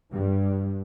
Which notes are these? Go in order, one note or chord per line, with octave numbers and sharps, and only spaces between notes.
G2 G3